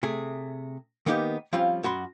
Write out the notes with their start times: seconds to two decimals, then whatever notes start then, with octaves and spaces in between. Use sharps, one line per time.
0.03 C3 A3 G#4
1.06 D#3 A#3 B3 D#4 F#4 G4
1.53 F3 G3 C4 C#4 F4
1.83 F#2 F#4 B5 C6